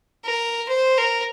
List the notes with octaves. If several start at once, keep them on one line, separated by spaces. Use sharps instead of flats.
A#4
C5
A#4